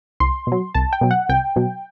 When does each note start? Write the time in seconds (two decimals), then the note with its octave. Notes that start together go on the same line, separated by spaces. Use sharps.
0.20 C2 C6
0.47 B2 F#3
0.74 C2 A5
0.93 G5
1.01 B2 F#3
1.11 F#5
1.29 C2 G5
1.56 B2 F#3